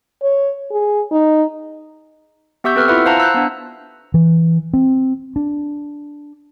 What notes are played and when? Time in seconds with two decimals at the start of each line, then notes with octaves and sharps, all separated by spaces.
0.22 C#5
0.71 G#4
1.11 D#4
2.64 B3 G4 E5 C#6 E6 G6
2.75 C4 A4 B4 F6
2.88 E4 F4 B4 E5 F#5
3.05 C5 F5 F#5 A5 A#5
3.20 E6 F#6 G6
3.35 B3 D4
4.14 E3
4.73 C4
5.36 D4